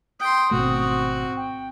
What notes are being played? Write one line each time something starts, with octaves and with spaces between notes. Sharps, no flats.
G5 C6 D#6
G#1 B2 A3 C4 F#4
G5